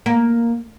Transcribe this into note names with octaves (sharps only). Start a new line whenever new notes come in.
A#3